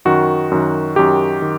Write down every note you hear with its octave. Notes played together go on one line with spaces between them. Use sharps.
F#2 D#3 F#4
F#2 D#3
F#2 D#3 G4
D#3